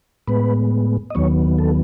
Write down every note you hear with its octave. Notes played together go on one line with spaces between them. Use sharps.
A2 G#3 B3 B4
D#5
D#2 D#3 F#3 B3 C#5
A4